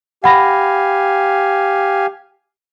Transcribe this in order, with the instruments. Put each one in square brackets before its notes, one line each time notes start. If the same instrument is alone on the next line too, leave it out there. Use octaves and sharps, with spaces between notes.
[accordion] G4 F5 G#5 [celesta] F#5 B5 A#6